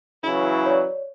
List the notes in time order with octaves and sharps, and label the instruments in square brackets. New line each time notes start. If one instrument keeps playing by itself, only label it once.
[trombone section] C#3 E3 F#3 [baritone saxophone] E4
[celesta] C#5 D5